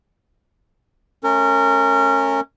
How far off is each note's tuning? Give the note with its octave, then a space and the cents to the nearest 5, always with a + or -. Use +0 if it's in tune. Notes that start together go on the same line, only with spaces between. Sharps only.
A3 -40 C#4 -15 A#4 -30